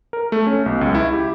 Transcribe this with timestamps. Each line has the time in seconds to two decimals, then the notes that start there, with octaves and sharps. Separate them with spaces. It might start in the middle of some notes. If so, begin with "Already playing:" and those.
0.13 A#4
0.32 A3
0.47 C#4
0.66 B1
0.81 C#2
0.95 E4
1.13 G4